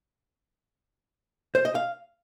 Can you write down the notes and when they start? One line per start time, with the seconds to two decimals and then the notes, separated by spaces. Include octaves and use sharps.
1.55 C5
1.65 D#5
1.75 F5